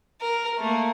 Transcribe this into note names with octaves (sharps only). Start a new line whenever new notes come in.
A#4
A3 A#3